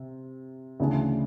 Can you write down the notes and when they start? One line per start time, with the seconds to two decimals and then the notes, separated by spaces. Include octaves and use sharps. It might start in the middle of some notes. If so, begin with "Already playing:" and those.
Already playing: C3
0.80 D2 C#3 E3 A3 D4